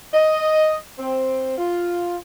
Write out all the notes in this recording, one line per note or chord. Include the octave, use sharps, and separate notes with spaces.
D#5
C4
F4